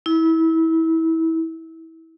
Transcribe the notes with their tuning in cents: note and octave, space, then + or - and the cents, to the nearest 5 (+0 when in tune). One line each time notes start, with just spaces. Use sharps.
E4 -25